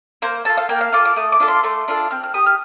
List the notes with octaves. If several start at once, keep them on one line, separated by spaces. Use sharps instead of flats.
A#3 C5
F4 A4 A5
F5
A#3 G5
F5
F4 A4 D6
D6
A3 D#6
D6
D4 F4 A4
C6
A3 C6
D4 F4 A4
C4 F6
F6
G4 D#6
F6